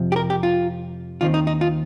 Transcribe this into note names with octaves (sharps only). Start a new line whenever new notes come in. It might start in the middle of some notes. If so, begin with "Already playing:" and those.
Already playing: F2 C3 F3
G4
A#4
G4
F4
D#2 D#3 C4 F4
D#4
D#4
F4